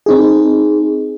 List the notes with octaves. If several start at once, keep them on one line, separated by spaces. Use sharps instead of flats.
C4 D#4 G#4